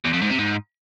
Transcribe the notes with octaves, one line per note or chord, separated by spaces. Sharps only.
E2
F2
G#2
C3
G#2